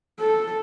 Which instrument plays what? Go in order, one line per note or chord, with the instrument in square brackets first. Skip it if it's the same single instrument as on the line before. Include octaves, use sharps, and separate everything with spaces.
[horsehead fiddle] A4